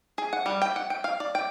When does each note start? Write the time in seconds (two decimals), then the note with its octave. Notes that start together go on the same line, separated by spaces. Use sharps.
0.18 G#4
0.33 F#5
0.46 G3
0.62 G5
0.76 F#5
0.90 G5
1.04 F5
1.20 D5
1.35 G5